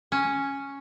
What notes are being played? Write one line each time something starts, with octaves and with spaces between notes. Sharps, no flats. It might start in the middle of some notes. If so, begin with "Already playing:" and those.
C#4